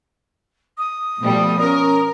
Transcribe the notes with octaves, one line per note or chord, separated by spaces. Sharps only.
D#6
B2 F3 G3 A3
C#4 A#4